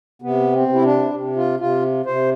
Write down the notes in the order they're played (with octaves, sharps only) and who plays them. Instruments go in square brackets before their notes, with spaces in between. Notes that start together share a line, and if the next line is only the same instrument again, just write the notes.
[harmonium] C3 B3
C4
C3
E4
D4
C3
F4
C3 F4
C3 C5